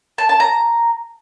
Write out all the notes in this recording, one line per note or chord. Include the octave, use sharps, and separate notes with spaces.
A5
A5
A#5